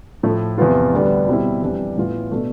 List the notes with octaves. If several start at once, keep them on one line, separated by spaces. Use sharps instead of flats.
A2 F3 A3
E2 C3 F3 B3 F4
D2 D3 G3 B3 D4
B2 G3 C4 E4
F2 E3 G3 D4
A1 A2 E3 B3 F4
B2 A3 D4